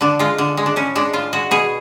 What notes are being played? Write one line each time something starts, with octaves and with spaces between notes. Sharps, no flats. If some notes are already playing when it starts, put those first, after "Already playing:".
D3 D4
G#3 F4
D3
G#3
D4
A2 C#4
G#3 D4
A2 F4
G#3 F#4
B2 G#4